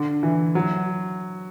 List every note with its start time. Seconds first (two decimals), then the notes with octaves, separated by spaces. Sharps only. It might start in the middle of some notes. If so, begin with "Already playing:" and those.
Already playing: D3
0.23 E3
0.55 F#3